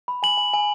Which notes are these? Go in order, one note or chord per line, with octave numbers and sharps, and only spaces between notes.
B5
G#5 F#7
G#5
G#5